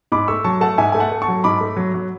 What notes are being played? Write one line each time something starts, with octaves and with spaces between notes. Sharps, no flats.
G#2 B5 D6
A3 C#6 E6
F#3 A5 C#6
A3 F#5 A5
G#2 E5 G#5
A3 G#5
F#5 A5
A3
A5 C#6
F#3
G#2 B5 D6
A3
F#3
F#3